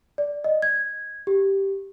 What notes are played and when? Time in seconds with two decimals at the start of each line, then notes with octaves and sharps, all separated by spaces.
0.18 D5
0.44 D#5
0.62 G#6
1.27 G4